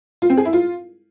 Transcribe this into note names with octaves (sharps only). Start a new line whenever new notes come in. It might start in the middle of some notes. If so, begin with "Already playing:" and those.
F4
C4
G#4
E4
F4